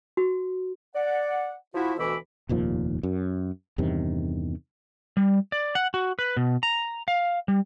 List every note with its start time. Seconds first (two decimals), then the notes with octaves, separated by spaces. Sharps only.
0.17 F#4
0.95 D5 F#5
1.74 F3 E4 F#4
1.99 D2 B2 E3 B5 D6 E6
2.49 F1 D#2 A#2 F3
3.03 F#2
3.78 E2 G2 C3 D#3
5.17 G3
5.52 D5
5.75 F#5
5.94 F#4
6.19 B4
6.37 B2
6.63 A#5
7.08 F5
7.48 G3